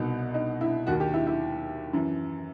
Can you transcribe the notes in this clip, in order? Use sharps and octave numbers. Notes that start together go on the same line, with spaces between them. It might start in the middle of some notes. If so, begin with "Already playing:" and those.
Already playing: C2 B2 D#4
D#4
E4
D#2 D#3 F#4
G4
E4
E4
F#2 E3